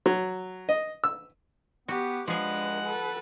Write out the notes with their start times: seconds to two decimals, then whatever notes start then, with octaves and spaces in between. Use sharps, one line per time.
0.06 F#3
0.69 D#5
1.04 E6
1.88 B3 F#4 G4
2.28 F3 G#3 D4 G#4 B4 F#5
2.84 A4 B4